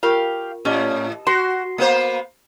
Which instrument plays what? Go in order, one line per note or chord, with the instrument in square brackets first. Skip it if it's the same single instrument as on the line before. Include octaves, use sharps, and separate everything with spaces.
[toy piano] F4 A#4 C#6 [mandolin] G4 F5
[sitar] A2 [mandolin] C#4 [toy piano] G4 D#5 D6
[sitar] F#4 [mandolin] C6
[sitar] A#3 B3 C5